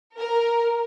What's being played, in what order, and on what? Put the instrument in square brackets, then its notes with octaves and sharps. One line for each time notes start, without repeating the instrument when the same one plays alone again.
[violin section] A#4